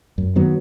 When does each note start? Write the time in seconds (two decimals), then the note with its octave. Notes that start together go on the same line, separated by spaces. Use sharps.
0.18 F#2
0.36 D#3 F#3 B3